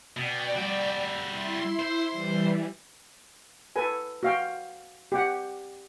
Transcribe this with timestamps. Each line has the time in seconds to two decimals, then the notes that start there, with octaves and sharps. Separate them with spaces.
0.17 B2 D5 G5
0.56 G3 F#4
1.29 E4 C6
1.79 C5
2.11 E3 G3
3.76 A4 B4 G#5
4.23 F#4 F5 G5
5.12 G4 F#5